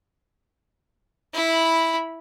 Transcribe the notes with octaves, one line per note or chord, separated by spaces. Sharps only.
E4 B5